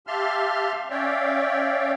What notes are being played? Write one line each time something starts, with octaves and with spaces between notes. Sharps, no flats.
G4 E5 F5 A5 C6 F6
C#4 C#5 D5 E5 F5 G5